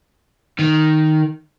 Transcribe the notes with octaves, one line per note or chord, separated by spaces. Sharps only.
D#3